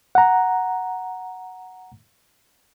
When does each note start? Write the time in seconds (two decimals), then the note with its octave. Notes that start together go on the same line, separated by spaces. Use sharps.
0.15 F#5 A#5